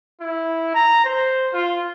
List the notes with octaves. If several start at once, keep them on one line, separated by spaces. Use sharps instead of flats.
E4
A#5
C5
F4